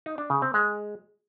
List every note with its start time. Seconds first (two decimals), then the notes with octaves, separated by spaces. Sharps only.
0.06 D#4
0.18 D4
0.30 C#3
0.42 C4
0.54 G#3